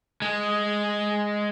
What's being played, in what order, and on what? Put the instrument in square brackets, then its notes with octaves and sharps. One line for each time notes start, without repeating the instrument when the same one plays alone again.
[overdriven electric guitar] G#3